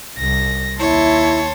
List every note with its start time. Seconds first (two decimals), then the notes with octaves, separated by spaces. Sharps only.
0.18 C2 A#6
0.79 D#2 E4 C#5 A5 C6